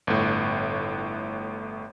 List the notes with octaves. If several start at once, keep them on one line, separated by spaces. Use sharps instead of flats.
G1 A2